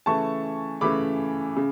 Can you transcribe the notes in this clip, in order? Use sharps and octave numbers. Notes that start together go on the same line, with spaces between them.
C#3 E3 A3 A5 C#6
C#3 E3 A3 B5 D6
C#3